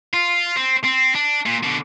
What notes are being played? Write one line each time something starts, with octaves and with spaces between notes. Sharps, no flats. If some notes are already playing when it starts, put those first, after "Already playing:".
F4
C4
C4
D4
A#2
B2 D3